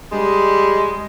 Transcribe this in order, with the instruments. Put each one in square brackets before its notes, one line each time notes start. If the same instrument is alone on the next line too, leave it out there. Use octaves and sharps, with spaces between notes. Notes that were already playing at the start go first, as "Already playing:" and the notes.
[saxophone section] G3 G#3